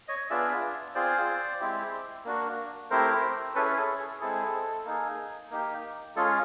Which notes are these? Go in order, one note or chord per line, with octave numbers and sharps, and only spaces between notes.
C#5 D#5
B3 D4 F4 G#4 D5 E5
C4 F4 G#4 C5 D5
G#3 C4 E4 G4
A#3 D4 F#4
A3 C4 E4 G4 A#4 C5
C#4 E4 G#4 A4 B4
A4
G#4
G#3 C4 E4 G#4 A4
A#3 D#4 G#4
A#3 D#4 G4
G#3 C#4 F4 G#4 A4